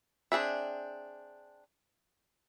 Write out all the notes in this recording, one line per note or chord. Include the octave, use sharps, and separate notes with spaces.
C4 D4 G#4 E5